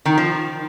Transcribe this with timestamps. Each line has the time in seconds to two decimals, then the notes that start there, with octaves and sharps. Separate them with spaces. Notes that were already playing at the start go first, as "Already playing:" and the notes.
0.05 D#3 D#4
0.18 F3